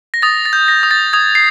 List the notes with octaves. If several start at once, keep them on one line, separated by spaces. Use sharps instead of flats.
A#6
D#6 A6
A6
G6
A#6
D#6
A6
D#6 G#6
C7